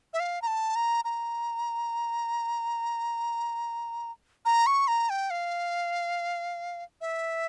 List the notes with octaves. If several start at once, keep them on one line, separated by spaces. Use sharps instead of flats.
E5
F5
A#5
A5
A#5
A#5
A#5
C#6
A#5
G5
F5
E5